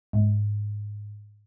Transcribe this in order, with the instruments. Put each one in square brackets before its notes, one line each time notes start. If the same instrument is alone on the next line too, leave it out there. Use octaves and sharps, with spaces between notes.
[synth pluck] G#2